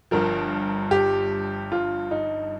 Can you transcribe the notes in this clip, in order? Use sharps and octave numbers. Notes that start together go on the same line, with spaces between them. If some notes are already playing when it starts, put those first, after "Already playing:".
G1 G2 F3 A#4
G4
F4
D#4